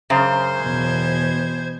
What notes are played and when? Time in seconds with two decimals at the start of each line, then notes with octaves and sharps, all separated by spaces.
0.10 F#2 C#3 C5
0.60 E2 B2 G#6